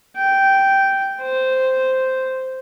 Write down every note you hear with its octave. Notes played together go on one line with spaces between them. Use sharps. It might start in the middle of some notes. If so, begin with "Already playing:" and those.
G5
C5